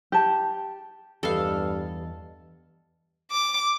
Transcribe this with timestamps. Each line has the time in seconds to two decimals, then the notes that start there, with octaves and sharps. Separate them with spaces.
0.12 G4 A5
1.23 E2 G2 G4 A4 B4 D#5 F5
3.31 D6